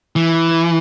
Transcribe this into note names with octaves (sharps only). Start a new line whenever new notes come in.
E3